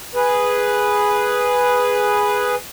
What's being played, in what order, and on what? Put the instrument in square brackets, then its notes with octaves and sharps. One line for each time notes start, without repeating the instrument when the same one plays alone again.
[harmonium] G#4 B4